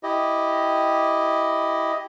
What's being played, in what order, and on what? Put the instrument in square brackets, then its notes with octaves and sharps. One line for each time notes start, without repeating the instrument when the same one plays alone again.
[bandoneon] E4 G4 D#5